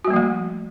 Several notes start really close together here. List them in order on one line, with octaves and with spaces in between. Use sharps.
F#4 G3 A#3 F3 A3